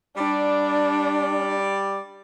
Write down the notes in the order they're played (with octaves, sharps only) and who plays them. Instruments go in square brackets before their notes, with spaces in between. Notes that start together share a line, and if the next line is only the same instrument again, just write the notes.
[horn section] G3 D5 [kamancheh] D4